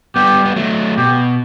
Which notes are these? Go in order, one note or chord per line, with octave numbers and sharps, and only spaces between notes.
G3 B3 G4
B3
F#3 A3
B2 G4